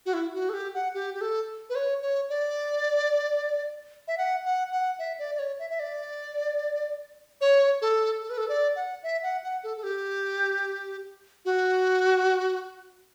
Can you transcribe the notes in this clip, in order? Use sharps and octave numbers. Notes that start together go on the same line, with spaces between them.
F#4
E4
F#4
A4
G4
F#5
G4
G4
A4
B4
C#5
C#5
D5
E5
F#5
F#5
F#5
E5
D5
D5
C#5
E5
E5
D5
C#5
A4
A4
B4
A4
D5
F#5
E5
F#5
F#5
A4
A4
G4
F#4